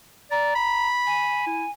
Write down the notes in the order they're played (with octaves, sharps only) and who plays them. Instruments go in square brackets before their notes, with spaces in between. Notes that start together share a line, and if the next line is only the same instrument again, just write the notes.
[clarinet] D5 [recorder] A#5
[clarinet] B5
[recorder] G#5
[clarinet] E4